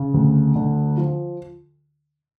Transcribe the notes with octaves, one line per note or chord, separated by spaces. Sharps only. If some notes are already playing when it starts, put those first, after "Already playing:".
Already playing: C#3
D2
D3
F3